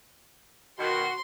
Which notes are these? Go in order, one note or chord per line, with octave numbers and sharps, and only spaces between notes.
B2 D#3 F#4 C6